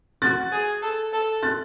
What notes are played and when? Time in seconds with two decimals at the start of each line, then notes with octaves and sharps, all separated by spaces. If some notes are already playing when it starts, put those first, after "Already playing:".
0.22 F#4 F#6 A6
0.52 G#4
0.82 A4
1.13 A4
1.43 F#6 A6